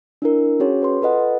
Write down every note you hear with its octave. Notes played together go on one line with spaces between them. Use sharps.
D4 E4 A#4
C#4 F#4 G#4 C#5
B4 C6
F4 A4 B4 D#5 F#5